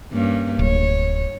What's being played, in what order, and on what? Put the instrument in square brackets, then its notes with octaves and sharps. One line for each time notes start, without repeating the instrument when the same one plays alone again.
[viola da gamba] G2 A#3 C#4
[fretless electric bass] D1 [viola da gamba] C#5